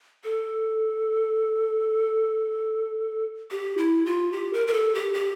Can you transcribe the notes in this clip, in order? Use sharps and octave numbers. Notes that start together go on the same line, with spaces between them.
A4
G4
E4
F4
G4
A#4
A#4
A4
G4
G4